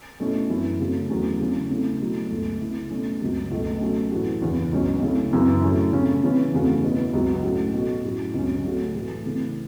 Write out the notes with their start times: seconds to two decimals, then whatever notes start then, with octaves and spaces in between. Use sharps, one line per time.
0.20 B2 A3 C#4 E4
0.50 F#2 E3 C#4 E4
0.80 C#3 F#3 A3
1.10 E2 C#3 F#3 A3 C#4
1.39 C#3 A3 C#4 E4
1.70 C#3 A3 C#4 E4
2.00 B2 F#3 A3 E4
2.31 C#2 B2 A3
2.61 C#3 F#3 B3 E4
2.90 B2 A3 C#4
3.21 C#2 C#3 F#3
3.51 C#2 B2 A3 F#4
3.81 B2 F#3 A3 C#4
4.11 A2 E3 A3 F#4
4.42 E2 C#3 E3
4.72 C#2 B2 F#3 C#4
5.02 C#3 A3 E4
5.33 F#2 C#3 E3 C#4 E4
5.62 A2 F#3 A3 C#4 E4
5.93 C#3 A3 C#4
6.23 C#3 E3 C#4 E4
6.53 E2 C#3 A3 C#4 F#4
6.83 B2 B3 E4
7.13 C#2 C#3 F#3 B3 F#4
7.43 A2 A3 C#4 F#4
7.74 B2 A3 F#4
8.04 A2 F#3 C#4 F#4
8.34 C#2 C#3 F#3 C#4
8.64 C#3 A3 F#4
8.95 A2 E3 A3 F#4
9.24 C#3 E3 A3